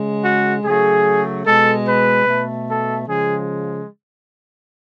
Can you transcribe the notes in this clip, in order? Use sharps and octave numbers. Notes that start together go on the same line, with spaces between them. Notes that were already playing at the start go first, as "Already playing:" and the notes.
Already playing: C#3 G#3
F#4
C#3 F#3 A3 G#4
B2 G#3 A4
B4
B2 A3
A4
C#3 F3 G#3 G#4